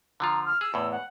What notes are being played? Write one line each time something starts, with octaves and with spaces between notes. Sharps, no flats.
D3 F3 F4 A#5
F6
G#4 E6
E2 A2
F#5